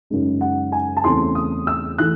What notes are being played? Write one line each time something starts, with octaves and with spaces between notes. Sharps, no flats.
F#2 C#3 G#3 D#4
F#5
G#5
A5
E2 C#3 E3 A3 C4 C6
D#6
E6
E3 A3 F#6